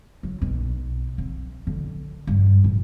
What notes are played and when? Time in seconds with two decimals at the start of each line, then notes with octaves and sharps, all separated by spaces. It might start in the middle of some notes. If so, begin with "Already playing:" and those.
0.23 F#3
0.42 B1
1.18 C4
1.67 D3
2.27 G2
2.64 A1